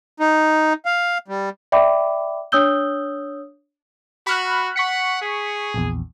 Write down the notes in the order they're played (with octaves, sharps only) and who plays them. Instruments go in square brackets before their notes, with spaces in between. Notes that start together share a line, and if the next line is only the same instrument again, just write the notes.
[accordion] D#4
F5
G3
[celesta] D5 E5 G5 B5 D6
D4 C#5 D#6 E6 G6 G7
[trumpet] F#4 [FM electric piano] B5 F6 F#6
[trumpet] F#5 [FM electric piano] C#6 B6 C#7
[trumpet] G#4
[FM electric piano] A#1 E2